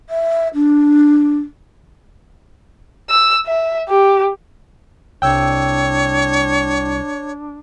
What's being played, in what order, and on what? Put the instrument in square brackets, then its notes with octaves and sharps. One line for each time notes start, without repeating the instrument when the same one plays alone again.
[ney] E5
D4
[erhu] E6
E5
G4
[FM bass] C2 [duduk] D4 [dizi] C#5 [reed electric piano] G5 E6